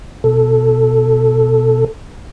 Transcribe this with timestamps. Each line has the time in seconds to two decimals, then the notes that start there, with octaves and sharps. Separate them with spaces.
0.24 B2 A4